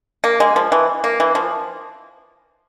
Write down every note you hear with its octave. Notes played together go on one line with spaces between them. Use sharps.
A#3
G#3
F3
E3
A#3
E3
F3